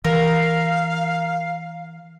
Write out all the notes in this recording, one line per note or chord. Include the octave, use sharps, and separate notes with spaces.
E3 A#4 F5